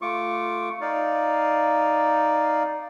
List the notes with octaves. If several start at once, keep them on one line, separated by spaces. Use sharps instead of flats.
A3 F4 C#6 D6
D#4 D5 F5